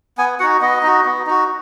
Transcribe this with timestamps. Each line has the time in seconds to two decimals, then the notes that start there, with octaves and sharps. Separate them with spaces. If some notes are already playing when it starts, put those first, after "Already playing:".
0.18 B3 G#5
0.39 D#4 F#4 F#5
0.61 B3 D#5
0.83 D#4 F#4
1.05 B3
1.27 D#4 F#4